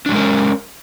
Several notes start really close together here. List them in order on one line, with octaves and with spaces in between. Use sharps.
D4 F#3 G#3 A#4 C#4